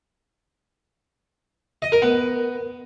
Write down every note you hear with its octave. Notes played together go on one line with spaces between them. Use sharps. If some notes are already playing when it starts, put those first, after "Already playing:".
D#5
A#4
B3